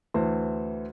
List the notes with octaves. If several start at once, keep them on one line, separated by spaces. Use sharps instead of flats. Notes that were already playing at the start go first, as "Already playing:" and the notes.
D2 E3 C5